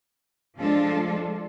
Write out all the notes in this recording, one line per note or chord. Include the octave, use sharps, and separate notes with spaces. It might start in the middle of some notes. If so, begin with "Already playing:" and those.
F3 G#3 D4 F4 A4